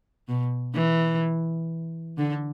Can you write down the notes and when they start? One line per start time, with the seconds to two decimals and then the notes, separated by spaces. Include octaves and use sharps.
0.28 B2
0.75 E3
2.18 D3